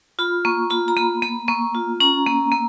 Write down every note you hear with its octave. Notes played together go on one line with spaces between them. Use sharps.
F4 B5
A#3 C#6
F4 B5
A#5
A#3 B5
A#3 B5
A#3 C#6
F4
C#4 A#5
A#3
A#3